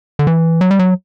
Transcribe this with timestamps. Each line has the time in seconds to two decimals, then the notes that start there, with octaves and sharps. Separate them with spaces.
0.19 D3
0.27 E3
0.61 F#3
0.71 G3
0.79 F#3